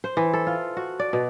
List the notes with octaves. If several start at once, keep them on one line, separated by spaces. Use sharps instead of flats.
C5
E3
A4
F4
F#4
D5
B2